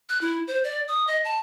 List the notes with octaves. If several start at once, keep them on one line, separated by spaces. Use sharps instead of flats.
F#6
E4
C5
D5
D#6
D#5
A5